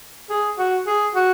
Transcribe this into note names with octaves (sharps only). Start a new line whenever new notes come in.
G#4
F#4
G#4
F#4